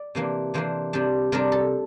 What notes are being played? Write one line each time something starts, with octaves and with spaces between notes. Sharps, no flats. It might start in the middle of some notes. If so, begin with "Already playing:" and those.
Already playing: D5
C3 E3 A#3 D4
C3 E3 A#3 D4 C5
C3 G3 D4
C3 G3 D4 A#4
A4